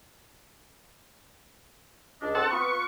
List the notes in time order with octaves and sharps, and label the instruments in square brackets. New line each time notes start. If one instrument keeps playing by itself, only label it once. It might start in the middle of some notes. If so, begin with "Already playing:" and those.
[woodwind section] C#2 D4 D#5
[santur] C4 [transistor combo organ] A4 F#5 A5
[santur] B3 F4 [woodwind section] B4 [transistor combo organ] C#6